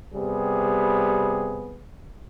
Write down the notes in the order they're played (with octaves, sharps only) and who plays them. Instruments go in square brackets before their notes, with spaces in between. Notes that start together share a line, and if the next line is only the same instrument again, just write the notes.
[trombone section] C3 G3 B3 G#4